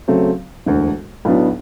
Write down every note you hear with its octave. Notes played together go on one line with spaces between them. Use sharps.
C#3 F#3 A3 C4
E1 D2 D3
B1 A2 F#3 B3 D4